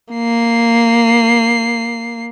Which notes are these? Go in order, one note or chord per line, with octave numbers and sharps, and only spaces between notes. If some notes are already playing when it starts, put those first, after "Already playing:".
A#3 C7